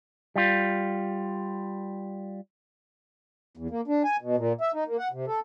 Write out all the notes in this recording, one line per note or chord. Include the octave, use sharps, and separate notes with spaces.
G3 F4
E2
A#3
D4
G#5
B2
A#2
E5
D#4
A#3
F#5
C3
A4